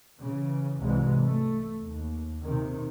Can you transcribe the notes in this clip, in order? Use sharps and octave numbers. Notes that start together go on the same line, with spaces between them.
C#3 E3
C2 G#2 C3 E3 F#3 G#3
A3
D#2
C3 D#3